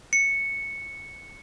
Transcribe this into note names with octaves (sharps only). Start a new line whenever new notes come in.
C#7